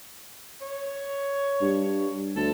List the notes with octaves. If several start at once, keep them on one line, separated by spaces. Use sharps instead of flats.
C#5
G2
D2 A4